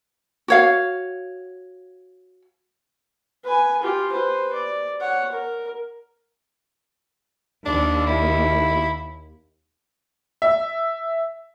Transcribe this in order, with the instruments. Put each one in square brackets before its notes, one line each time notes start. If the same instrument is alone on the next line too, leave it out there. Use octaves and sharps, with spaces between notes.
[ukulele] F#4 C#5 F5
[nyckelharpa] B4 G#5
F4 G4
B4 C5
D5
C#5 F#5
A#4
[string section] D#2 [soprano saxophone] D4
[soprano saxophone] E4
[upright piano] E5